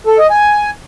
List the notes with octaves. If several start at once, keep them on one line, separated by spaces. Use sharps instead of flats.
A4
D#5
G#5